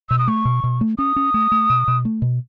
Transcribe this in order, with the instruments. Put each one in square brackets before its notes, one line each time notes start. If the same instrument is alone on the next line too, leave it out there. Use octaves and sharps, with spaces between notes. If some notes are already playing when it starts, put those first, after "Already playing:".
[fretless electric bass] B2 [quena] E6
[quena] D#6
[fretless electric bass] A3 [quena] C#6
[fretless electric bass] B2
B2
A3
[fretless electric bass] C#4 [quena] D#6
[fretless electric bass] C#4
A3
A3
B2
B2
A3
B2